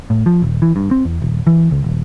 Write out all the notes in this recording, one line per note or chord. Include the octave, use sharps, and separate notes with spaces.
A2
F3
D#1
E3
G2
C4
E2
D#1
E3
C#2
D#1